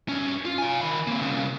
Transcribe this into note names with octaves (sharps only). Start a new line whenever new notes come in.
G2 C#4
F4
F5 G#5
D#3 B5
A#3 C4
C2 C#3